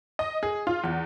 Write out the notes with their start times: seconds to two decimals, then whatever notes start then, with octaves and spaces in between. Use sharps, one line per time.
0.19 D#5
0.43 G#4
0.67 F4
0.84 E2